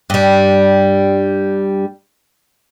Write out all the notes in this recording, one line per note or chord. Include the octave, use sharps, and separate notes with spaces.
G2 G3